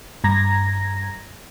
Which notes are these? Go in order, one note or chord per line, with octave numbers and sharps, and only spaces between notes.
G2 A#5 G#6 A#6